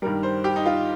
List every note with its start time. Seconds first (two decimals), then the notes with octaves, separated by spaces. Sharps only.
0.02 G2 D#3 G3 A#4
0.23 C5
0.44 G4
0.56 D#4
0.66 F4